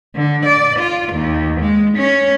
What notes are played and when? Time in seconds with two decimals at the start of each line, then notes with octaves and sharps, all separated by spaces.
0.15 D3
0.45 D5
0.78 F4
1.12 D#2
1.60 G#3
1.97 C#4